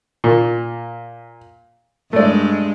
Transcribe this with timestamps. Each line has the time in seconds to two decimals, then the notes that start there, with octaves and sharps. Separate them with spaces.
0.24 A#2
2.13 G2 G#3 A3 D5